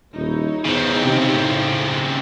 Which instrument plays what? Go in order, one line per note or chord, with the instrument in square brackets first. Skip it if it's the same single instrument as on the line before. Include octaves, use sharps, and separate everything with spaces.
[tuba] D#1 [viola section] D#4 E4 C#5
[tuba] E2 [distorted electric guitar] C#3 C4
[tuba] C3
A2